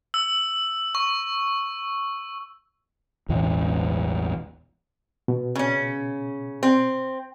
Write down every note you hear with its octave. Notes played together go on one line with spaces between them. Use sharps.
E6
C#6
A1 E2 B2 E3
B2
C#3 C#4
C4